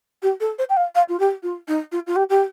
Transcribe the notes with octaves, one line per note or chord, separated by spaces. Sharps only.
G4
A4
C5
G5
F5
F5
F4
G4
F4
D#4
F4
F4
G4
G4